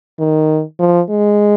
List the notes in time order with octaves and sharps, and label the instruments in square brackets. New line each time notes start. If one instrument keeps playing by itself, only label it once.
[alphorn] D#3
F3
G#3